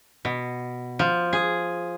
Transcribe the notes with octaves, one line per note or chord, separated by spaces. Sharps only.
B2
F3
G#4